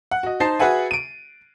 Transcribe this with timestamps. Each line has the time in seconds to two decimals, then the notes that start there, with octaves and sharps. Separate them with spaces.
0.11 F#5
0.23 F#4 D#5
0.40 D#4 C5 A5 A6 C7
0.59 F#4 G#4 B4 E5 F#5 G#5
0.91 D7 D#7